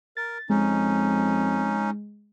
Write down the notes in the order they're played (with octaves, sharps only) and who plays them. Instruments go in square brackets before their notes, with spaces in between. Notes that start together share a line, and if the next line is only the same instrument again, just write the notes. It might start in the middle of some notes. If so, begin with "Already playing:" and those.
[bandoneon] A#4 [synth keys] A6
[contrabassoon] F2 [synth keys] G#3 [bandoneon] C#4 D#4